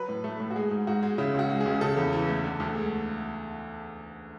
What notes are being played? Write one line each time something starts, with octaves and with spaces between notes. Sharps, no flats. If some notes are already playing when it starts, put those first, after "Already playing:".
Already playing: F#3 B4
A2
A3
A2
F#4
G#3 G#4
G#2
G#2 F#4
G#3
C#3 E4
C#2 F#4
G#3
G#4
C#2
C#3 A4
E2
E3
A3
D3
D2
G#3